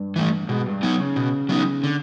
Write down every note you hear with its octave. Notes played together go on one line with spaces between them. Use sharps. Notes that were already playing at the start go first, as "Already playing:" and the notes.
Already playing: G2
E3 A3
G#2 B2
G2
F#3 B3 D#4
C#3
B2
F#3 B3 D#4
D3